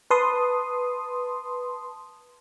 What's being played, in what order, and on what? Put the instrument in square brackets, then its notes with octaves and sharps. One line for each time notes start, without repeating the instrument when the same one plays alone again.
[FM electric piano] B4 A5 C6 D#6